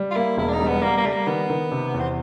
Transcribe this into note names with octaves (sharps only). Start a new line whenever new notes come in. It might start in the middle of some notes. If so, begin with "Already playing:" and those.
Already playing: G3
F4
A#3 E4
E1 E4
D4
D#4
G3
B3
G3 A#3
A#3
G3 A3
A#3
D#3 B3
D#3
C3
E2
C4